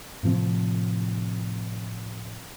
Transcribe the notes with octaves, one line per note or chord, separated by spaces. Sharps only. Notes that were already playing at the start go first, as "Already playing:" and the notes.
A2 C3 F3 C4